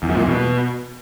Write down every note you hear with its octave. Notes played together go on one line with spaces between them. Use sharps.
E2
F#2
A#2
E2
B2